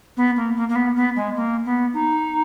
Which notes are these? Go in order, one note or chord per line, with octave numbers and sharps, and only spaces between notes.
B3
A#3
A#3
A#3
B3
B3
G#3
A#3
B3
D#4